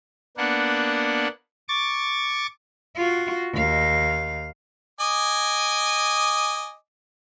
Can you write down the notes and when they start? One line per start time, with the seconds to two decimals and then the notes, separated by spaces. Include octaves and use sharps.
0.37 A#3 B3 D4 F#5
1.69 C#6 D6 A6
2.96 F4 F#4
3.53 D#2 F5
5.00 D#5 G#5 D6